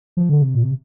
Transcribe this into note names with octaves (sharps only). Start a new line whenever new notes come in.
F3
D3
C3
A#2
C3